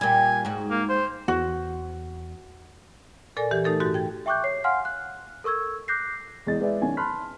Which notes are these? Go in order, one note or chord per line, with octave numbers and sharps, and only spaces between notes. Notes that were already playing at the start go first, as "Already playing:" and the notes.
A#2 G3 G#5
G#2 F#4
A#3
C5
E2 F#4
A#2 A4 A#4 D5 G#5
E3 G4
A3 D#4 A4 A#4
G#2 F#4 G4 A6
G5 G#6
E5 G5 C#6 D6 F#6 G6
C#5 C7
F5 F#5 G#5 C6 F6
F#6
A4 A#4 C#6 E6 G#6
D6 F#6 G6 A#6 C7
E2 G#3 D#5 A6
G#3 B4 D5 E5
B1 D#3 C#4 G#5
A5 B5 C6 F6 F#6 B6